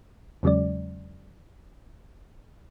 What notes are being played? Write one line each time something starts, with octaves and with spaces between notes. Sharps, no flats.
E2 C#3 F#3 G#3 C#4 D5